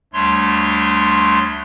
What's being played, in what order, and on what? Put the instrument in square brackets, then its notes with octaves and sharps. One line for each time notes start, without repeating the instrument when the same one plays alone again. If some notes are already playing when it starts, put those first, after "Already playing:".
[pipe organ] D2 G3 A3 D4 C#5 C6